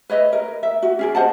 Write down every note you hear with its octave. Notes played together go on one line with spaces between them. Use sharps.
B4 C#5 D#5 E5
A#4
E5
F#4
C#4 G#4 D5
C5 D#5 F#5 A5